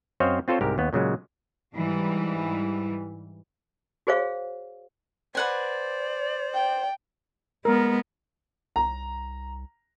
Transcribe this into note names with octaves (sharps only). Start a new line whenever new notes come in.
F#2 C4 C5 C#5 D#5 F5
C4 F4 A4 C5 C#5
C2 G#2 G4 A#4
D#2 B3
A#2 C#3 F#3 G#3
G#2 E3 G3
F#4 G#4 C5 C#5 F5
B4 C5 D5 F#5 G#5
G5
G#3 B3 A#4
C2 A#5